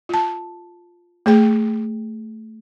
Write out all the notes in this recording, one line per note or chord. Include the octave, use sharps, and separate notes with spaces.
F4 A5
A3 G#4 G5